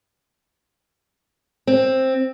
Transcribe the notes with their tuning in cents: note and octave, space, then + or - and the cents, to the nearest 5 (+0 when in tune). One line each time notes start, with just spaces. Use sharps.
C4 +10